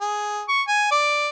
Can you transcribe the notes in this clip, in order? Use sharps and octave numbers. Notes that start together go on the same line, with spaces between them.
G#4
C#6
G#5
D5